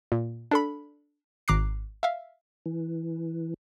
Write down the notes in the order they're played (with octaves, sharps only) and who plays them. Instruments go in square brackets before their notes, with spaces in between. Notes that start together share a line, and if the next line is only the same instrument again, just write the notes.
[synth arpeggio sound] A#2
D4 A4 B5
G#1 A#5 D6 F#6 C7
E5 F5
[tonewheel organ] E3